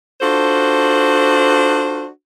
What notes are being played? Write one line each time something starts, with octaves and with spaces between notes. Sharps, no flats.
D4 F4 F#4 A4 C5